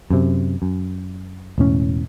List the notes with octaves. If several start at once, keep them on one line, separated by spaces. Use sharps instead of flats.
F#2 C3
F#2
E1 A2 C#4